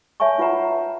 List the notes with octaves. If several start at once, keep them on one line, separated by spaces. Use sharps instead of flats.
C#5 E5 G#5 A5 C#6
E4 F4 B4 F#5 A#5